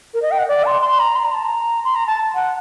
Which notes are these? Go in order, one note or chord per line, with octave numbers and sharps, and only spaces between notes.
A#4
D#5
G5
F#5
D5
C6
C6
A#5
C6
A#5
A5
A#5
C6
A#5
A5
F#5